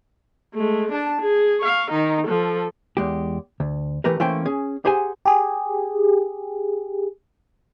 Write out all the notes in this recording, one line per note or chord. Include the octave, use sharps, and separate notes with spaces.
G#3 A3
D4 A5
G#4
F5 C#6
D#3 D#4
F3 A4
E2 G#3 G4
D2
E3 A3 G4 A#4 B4
E3 A3 A#3 C#4 C5 G5
C#4 G#4
G4 G#4 C5 F#5 G#5
G4 G#4